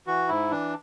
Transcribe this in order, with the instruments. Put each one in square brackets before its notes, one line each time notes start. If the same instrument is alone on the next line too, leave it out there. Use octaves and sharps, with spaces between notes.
[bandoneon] E3 F#4
G#2 E4
E3 D4